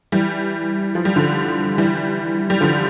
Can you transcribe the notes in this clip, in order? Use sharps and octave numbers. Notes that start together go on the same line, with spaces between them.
E3 G3
F3
G3
D3 F3
E3 G3
G3
D3 F3